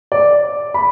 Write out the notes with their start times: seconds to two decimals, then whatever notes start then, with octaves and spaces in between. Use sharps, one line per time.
0.12 D5
0.74 B5